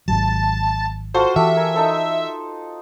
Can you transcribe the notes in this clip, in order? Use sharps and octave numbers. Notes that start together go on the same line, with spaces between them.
G#1 D#2 F#3 A5
F4 F#4 A4 C5
E3 G4 A4 E5
A#4 G#5
D#4 A4 C5